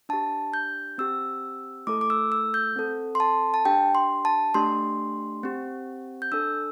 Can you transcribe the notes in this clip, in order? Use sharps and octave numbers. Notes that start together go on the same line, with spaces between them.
D4 G4 A5
G6
C4 G4 E6
A3 E4 A4 D6
D6
E6
E6
G6
C4 A4
C6
A5
A5
D4 G4 G5
C6
A5
A3 D4 G4 C6
C4 G4
G6
D4 A4 E6